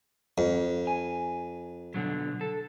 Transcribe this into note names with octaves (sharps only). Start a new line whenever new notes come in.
F2
G#5
B2 D3 F#3
A4